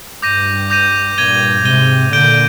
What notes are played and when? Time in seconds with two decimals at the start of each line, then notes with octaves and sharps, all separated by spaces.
0.22 G2 D6 G6 A#6 D#7
0.70 D6 G6 A#6 D#7
1.18 G2 A#2 G#6 D#7 G7
1.65 G#2 C3 G#6 D#7 G7
2.13 A#2 D3 G6 D7 G7